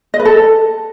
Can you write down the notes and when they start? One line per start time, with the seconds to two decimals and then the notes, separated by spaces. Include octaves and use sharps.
0.14 D#5
0.20 B4
0.25 A4